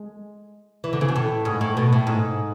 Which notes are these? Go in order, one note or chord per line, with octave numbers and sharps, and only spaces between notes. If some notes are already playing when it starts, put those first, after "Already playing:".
Already playing: G#3
E3
D3
C#3
B2
A2
G#2
A2
B2
A2
G#2